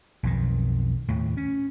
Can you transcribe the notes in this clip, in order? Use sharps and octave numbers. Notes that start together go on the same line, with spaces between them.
B1 F2 D#3
D#2 A2
C#4